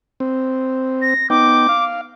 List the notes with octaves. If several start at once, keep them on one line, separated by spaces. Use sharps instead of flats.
C4
A#6
B3 D#4 G5 D6
F5